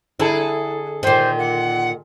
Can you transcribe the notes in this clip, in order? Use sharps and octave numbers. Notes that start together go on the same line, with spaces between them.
D3 E4 G#4 A4
A#2 D#3 C5
F#5